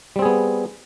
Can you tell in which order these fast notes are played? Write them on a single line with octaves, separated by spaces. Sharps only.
G3 C4 G#4 B3